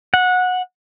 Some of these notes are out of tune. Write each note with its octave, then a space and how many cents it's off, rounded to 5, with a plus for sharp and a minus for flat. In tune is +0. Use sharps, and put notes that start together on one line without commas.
F#5 -20